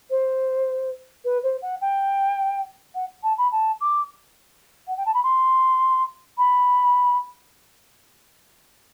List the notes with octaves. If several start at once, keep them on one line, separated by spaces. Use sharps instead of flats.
C5
B4
C5
F#5
G5
F#5
A5
B5
A5
D6
F#5
G5
A5
B5
C6
B5